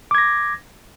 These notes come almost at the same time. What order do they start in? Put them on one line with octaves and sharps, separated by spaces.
D6 G#6 A#6